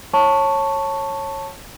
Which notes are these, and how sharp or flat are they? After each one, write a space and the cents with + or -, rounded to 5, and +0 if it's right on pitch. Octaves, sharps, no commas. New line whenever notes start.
C#5 -20 A5 +5 C#6 +0